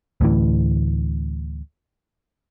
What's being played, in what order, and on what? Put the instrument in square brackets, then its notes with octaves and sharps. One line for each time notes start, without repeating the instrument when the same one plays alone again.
[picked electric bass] D2 A2 E3